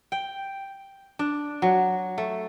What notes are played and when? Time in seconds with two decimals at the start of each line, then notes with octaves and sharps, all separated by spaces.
0.12 G5
1.19 D4
1.62 F#3
2.18 A3